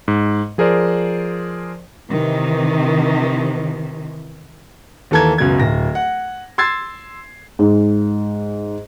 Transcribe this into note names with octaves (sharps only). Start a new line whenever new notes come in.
G#2
F3 G#4 A#4 C5 D5
C3 D#3 E3
D#2 E3 A4 A#5 G#6
C#2 F#2 B2 G#6
D1 A#6
F#5
C6 E6 G#6 A6 C7
G#2